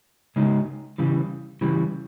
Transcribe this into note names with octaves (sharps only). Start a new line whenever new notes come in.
C#3 G#3 D#4
C#3 E3 G3
C#3 E3 G3